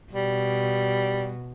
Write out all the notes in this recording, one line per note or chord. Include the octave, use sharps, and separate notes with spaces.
B2 G3